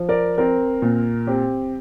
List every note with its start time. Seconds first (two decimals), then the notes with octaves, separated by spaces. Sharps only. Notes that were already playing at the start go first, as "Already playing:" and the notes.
Already playing: F3
0.09 A#4 D5
0.38 C4 A#4
0.82 A#2
1.27 C4 G4